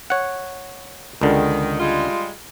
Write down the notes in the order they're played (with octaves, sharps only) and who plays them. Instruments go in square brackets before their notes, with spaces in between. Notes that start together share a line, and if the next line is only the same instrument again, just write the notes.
[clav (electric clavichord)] C#5 F#5
[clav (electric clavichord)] C#2 D3 [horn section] D#3
[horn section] G3 G#3 F4